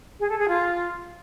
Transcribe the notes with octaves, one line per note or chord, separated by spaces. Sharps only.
G#4
A4
G#4
F4